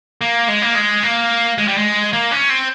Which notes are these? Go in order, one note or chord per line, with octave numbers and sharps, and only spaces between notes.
A#3
G#3
A#3
G#3
A#3
G#3
G3
G#3
A#3
C#4
C4